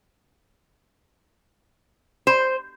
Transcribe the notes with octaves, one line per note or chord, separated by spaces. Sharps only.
C5